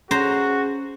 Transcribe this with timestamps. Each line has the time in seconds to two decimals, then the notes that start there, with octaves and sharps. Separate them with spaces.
0.11 C#4 F#4 G#4 C5 A#5